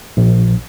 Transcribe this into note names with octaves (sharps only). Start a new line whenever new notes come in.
A#1